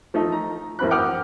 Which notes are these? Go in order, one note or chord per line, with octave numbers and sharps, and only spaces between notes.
F3 A3 D#4
A#5
A1 F#2 C4 B5 F#6
F#5 G5 D6 D#6 F6